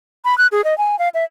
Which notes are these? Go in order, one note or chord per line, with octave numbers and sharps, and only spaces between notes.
B5
F#6
G#4
D#5
G#5
F5
E5